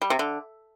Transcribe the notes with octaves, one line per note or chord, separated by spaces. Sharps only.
G3
C3
D3